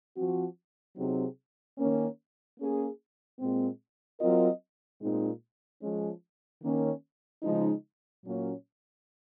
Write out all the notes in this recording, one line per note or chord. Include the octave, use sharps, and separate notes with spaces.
F3 C4 F#4
C3 F#3 C4 D#4 G#4
D#3 A#3 C#4
A#3 C#4 G#4
A#2 G#3 C4
F#3 C4 F4 A#4 D#5
A#2 G#3 C4 D#4
F3 G#3 C#4
D#3 A#3 C#4
C#3 F3 G#3 D#4
A#2 F#3 A#3 C#4